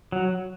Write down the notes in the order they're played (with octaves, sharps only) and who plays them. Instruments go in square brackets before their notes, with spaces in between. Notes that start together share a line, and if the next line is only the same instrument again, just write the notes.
[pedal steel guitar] F#3